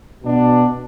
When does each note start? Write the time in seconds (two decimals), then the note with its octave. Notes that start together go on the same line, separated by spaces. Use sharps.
0.24 B2 D4